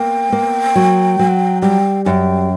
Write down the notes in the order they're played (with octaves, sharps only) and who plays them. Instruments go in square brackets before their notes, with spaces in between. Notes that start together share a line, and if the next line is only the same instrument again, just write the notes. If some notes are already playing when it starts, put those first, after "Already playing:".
Already playing: [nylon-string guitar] A#3 [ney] G5
[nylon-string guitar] A#3
F#3
F#3
[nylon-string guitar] G3 [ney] G5
[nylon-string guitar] F#2 [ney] G5 G#5